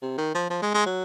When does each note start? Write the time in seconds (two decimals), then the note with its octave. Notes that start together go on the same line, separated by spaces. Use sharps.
0.02 C3
0.18 D#3
0.35 F3
0.50 F3
0.62 G#3
0.74 G#3
0.86 F#3